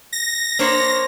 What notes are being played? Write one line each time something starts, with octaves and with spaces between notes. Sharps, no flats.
A#6
A#3 D4 C5 C#5 C6